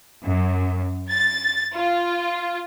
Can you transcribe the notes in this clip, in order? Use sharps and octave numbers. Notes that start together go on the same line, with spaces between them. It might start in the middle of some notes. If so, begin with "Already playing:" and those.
F#2
A6
F4